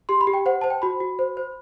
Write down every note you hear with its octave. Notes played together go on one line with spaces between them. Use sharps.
G4 C6
B5
G4
G5
C5 F#5
C5 A5
G5
F#4 B5
F#4
C5
C5